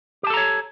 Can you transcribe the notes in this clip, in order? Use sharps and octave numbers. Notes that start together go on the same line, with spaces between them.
G4 A4 C#5 A5 A#5